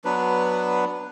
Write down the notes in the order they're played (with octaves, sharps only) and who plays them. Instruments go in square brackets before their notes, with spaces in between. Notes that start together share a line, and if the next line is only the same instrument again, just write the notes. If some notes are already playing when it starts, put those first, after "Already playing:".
[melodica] F#3 B3 D4 B4